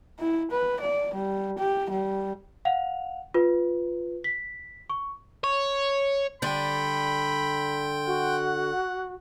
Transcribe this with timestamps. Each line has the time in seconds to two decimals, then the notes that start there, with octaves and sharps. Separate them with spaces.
0.19 E4
0.51 B4
0.81 D5
1.14 G3
1.58 G4
1.91 G3
2.65 F5 F#5 F7
3.34 F4 B4
4.24 B6
4.90 C#6
5.44 C#5
6.42 D3 G3 D5 G5 B5 C6 G6
8.07 F#4 F#5